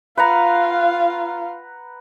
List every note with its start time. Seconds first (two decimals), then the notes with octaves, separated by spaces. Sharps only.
0.17 F4 B4 F5 F#5 A#5